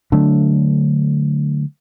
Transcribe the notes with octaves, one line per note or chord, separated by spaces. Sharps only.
D3 F#3 A3 D4